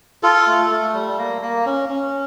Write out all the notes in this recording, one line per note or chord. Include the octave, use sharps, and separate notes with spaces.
F4 A4
A3
A3
G3
A#3
A#3
C#4
C#4